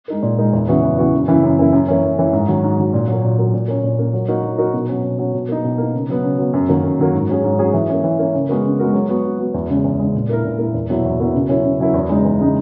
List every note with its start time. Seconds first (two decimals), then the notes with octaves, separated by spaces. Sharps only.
0.08 G#3 D#4 A#4
0.23 A#2
0.38 G#3 D#4 A#4
0.53 E2
0.68 C#3 E3 B3 F#4
0.83 E2
0.98 C#3 E3 B3 F#4
1.14 F#2
1.28 C#3 E3 A#3 E4
1.43 F#2
1.58 C#3 E3 A#3 E4
1.73 F#2
1.88 E3 A#3 C#4
2.03 F#2
2.18 E3 A#3 C#4
2.33 G#2
2.48 D#3 F#3
2.64 G#2
2.79 D#3 F#3
2.93 A#2
3.08 F#3 A#3
3.23 A#2
3.39 F#3 A#3
3.54 A#2
3.68 A#3 C#4
3.83 A#2
3.98 A#3 C#4
4.13 F#3
4.28 A#3 D#4 F#4 A#4
4.44 F#3
4.58 A#3 D#4 F#4 A#4
4.74 B2
4.89 F#3 C#4
5.03 B2
5.19 F#3 C#4
5.34 B2
5.49 A#3 D#4
5.64 B2
5.78 A#3 D#4
5.94 C#3
6.09 F#3 B3
6.23 C#3
6.38 F#3 B3
6.53 F#2
6.69 D#3 F#3 A#3
6.83 F#2
6.99 D#3 F#3 A#3
7.14 G#2
7.29 F#3 C#4 G#4
7.44 G#2
7.59 F#3 C#4 G#4
7.73 E3
7.89 A#3 C#4
8.04 E3
8.19 A#3 C#4
8.34 C#3
8.49 G#3 B3 F#4 A#4
8.64 C#3
8.79 G#3 B3 F#4 A#4
8.93 F#3
9.09 B3 F#4
9.24 F#3
9.39 B3 F#4
9.54 E2
9.69 C#3 G#3
9.84 E2
9.99 C#3 G#3
10.14 A#2
10.29 A#3 E4 A#4
10.44 A#2
10.59 A#3 E4 A#4
10.74 E2
10.90 B2 F#3 A#3 E4
11.05 E2
11.20 B2 F#3 A#3 E4
11.34 C#3
11.49 F#3 C#4 E4 A#4
11.64 C#3
11.80 F#3 C#4 E4 A#4
11.94 E2
12.09 C#3 G#3 D#4
12.25 E2
12.40 C#3 G#3 D#4